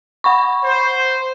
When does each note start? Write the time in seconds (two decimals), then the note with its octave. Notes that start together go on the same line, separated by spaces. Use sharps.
0.24 F#5 B5 C#6
0.64 C5